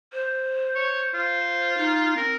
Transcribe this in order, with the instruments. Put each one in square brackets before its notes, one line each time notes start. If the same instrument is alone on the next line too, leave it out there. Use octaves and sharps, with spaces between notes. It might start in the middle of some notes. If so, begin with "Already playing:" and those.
[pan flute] C5
[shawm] C#5
F4
[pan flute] D#4
[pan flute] C4 [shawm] A#4